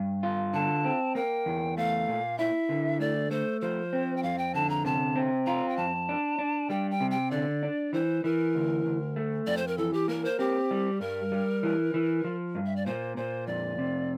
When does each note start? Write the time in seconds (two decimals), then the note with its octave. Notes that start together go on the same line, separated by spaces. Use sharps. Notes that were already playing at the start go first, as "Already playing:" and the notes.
Already playing: G2
0.23 F4
0.54 D3 A5
0.85 C4
1.15 A#3 G5
1.46 E2
1.77 A3 F5
2.08 A#2
2.38 E4 E5
2.69 D3
3.00 A3 D5
3.31 A3 C5
3.61 F3 C5
3.93 C4
4.17 G5
4.23 F2 F5
4.38 G5
4.54 D3 A5
4.70 A#5
4.85 C3 A5
5.16 C4
5.46 F4 A#5
5.69 G5
5.77 F2 A5
6.09 D4
6.39 D4
6.70 G3 G5
6.91 G5
7.00 C3
7.11 G5
7.31 D3 D5
7.63 D4
7.93 E3 C5
8.24 E3 A#4
8.55 D2
8.86 D2
9.16 A3
9.47 F2 D5
9.57 C5
9.68 A#4
9.78 E3 A4
9.93 G4
10.08 A#3 A#4
10.25 C5
10.39 C4 G4
10.71 G3
11.01 G2 A#4
11.32 G3
11.63 E3
11.94 E3
12.24 F3
12.55 G2
12.66 E5
12.76 D5
12.86 A#2 C5
13.17 A#2 C5
13.47 F2 D5
13.78 C3